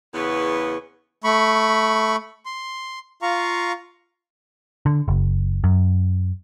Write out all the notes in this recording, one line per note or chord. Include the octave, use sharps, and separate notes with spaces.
E2 C#3 B3 B4 C#6
A3 B5 C#6
C6
F4 F5 A#5 C#6
D3
F#1
F#2